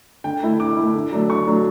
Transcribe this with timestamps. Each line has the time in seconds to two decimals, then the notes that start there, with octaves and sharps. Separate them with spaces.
0.24 D3 G5
0.43 A3 E4
0.60 D3 D6
0.77 A3 E4
0.95 D3
1.12 F#3 A3 D4
1.30 D3 C#6
1.47 F#3 A3 D4